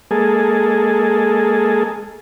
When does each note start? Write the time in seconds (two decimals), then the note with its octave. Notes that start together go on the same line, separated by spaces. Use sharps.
0.11 G#3 A#3 G#4 A4